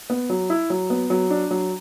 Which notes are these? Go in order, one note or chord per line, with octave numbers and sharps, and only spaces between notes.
B3
F#3
E4
F#3
B3
F#3
D4
F#3